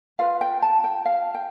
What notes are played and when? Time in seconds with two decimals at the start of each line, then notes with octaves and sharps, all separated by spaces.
0.19 F4 B4 F5
0.41 G5
0.62 A5
0.84 G5
1.05 F5
1.35 G5